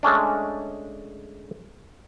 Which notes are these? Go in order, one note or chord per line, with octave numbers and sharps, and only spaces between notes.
G#3 A3 C#4 D4